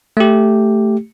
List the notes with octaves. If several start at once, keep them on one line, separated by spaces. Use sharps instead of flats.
A3 G4